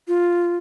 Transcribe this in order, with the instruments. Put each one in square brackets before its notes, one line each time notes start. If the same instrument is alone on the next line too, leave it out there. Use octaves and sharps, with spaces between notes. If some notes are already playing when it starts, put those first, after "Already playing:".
[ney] F4